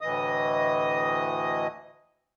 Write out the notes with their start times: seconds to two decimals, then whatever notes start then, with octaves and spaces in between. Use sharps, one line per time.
0.01 D2 A2 E3 D#5 D#6